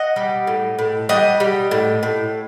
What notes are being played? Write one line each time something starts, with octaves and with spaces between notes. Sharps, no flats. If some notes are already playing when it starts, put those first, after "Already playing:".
Already playing: D#5 F#5
G3
A2
A2
G3 D#5 F#5
G3
A2
A2